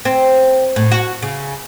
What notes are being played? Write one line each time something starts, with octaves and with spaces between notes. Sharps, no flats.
C4
A2
F#4
C#3